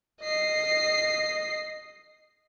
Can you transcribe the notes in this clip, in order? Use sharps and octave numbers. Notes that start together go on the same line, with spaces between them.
D#5 C7